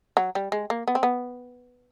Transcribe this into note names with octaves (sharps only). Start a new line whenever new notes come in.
F#3
G3
G#3
A#3
B3
C4
B3